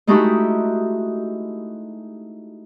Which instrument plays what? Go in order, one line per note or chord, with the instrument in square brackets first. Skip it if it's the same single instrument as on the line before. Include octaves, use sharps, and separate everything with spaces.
[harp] G#3 A3 D#4 E4 F#4 G4